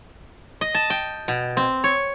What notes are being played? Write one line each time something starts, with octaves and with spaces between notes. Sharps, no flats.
D#5
A5
G5
B2
C4
C#5